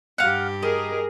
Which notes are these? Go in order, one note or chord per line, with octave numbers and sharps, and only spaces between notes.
G2 G4 F5 F#5
G#4 A#4 D#5